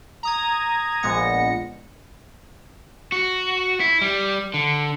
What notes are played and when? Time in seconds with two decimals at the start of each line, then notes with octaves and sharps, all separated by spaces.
0.23 A#5 D#6 G#6
1.03 A#1 A#2 G#3 B3 A#6 C#7
3.12 F#4
3.80 E4
4.01 G3
4.54 D3